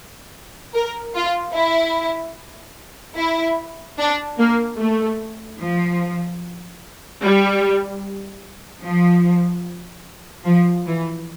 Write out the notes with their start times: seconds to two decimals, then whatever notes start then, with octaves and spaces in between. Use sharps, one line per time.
0.75 A#4
1.15 F4
1.56 E4
3.18 E4
3.98 D4
4.39 A#3
4.79 A3
5.60 F3
7.22 G3
8.84 F3
10.46 F3
10.86 E3